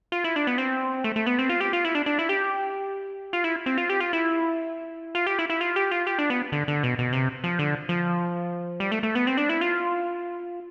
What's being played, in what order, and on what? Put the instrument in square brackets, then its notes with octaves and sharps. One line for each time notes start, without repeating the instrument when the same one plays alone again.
[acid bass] F4
E4
D4
B3
C4
A3
A3
B3
C4
F4
G4
F4
E4
D4
D4
E4
G4
F4
E4
C4
F4
G4
F4
E4
F4
G4
E4
E4
F4
G4
F4
G4
D4
B3
D3
D3
B2
B2
C3
F3
D3
F3
G3
A3
A3
B3
C4
D4
E4
F4